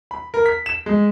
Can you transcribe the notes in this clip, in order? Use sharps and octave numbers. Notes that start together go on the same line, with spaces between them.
B5
A#4
B6
E7
G#3